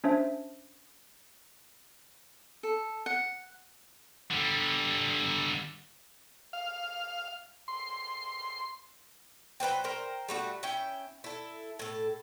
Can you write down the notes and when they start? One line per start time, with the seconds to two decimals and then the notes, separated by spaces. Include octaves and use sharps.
0.04 C#4 D4 C5 E5
2.63 A4
3.06 F#5
4.31 D3 G3
6.53 F5
7.68 C6
9.60 F#3 B4 C5 G5
9.84 A#4 C5 G5
10.28 G3 A3 F#4
10.63 C#4 E4 G5
11.24 E4 A4
11.79 A2 A4